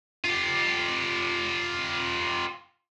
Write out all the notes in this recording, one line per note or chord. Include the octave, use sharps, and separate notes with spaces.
F4 G4